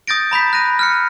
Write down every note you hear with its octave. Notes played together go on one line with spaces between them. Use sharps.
D#6 G6 A6 A#6 D7
A#5 B5 G6 B6
F#6 A#6 D#7
F6 F#6 C#7